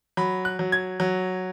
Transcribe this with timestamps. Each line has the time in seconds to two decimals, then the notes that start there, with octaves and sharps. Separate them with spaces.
0.17 F#3 B5
0.45 F#6
0.59 F#3
0.72 G#6
1.00 F#3